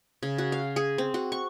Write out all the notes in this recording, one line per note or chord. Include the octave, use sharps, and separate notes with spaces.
C#3
F#4
F5
G#4
C4
F#4
C#6